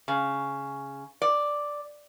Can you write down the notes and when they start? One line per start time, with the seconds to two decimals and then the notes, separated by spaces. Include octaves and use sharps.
0.08 C#3
1.22 D5